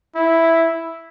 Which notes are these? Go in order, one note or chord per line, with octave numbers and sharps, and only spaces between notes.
E4